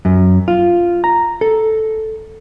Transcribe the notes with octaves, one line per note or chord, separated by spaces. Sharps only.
F#2
F4
A#5
A4